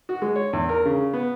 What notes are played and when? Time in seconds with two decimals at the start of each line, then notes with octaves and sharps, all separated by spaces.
0.09 F#4
0.22 G#3
0.36 C#5
0.53 E2
0.69 A#4
0.85 C#3
1.14 B3